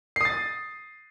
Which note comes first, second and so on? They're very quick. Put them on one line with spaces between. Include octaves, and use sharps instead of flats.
C7 D#6 A6